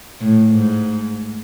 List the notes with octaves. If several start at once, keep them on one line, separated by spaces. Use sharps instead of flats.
A2
G#2